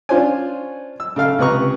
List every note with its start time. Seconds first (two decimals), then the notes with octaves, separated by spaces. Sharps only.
0.09 C#4 D4 F4 C5 C#5 G#5
1.00 E6
1.16 C#3 A4 F5 F6
1.39 C#2 C3 B4 A#5 C#6